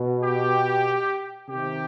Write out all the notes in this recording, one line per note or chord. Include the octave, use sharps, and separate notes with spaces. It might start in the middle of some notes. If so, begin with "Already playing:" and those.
Already playing: B2
G4
C3 D#3 G4